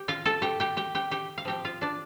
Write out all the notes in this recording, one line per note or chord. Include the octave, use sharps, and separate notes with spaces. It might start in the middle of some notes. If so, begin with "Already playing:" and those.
Already playing: G4 G5
F4 F5
A4 A5
G4 G5
G4 G5
G4 G5
G4 G5
G4 G5
F5
F3 C4 G4 G5
F4 F5
D4 D5